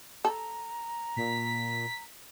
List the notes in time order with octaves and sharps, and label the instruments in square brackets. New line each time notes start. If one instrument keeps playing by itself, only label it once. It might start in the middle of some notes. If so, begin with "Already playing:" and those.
[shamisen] A4 [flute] A#5
[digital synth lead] A#2 [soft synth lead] B6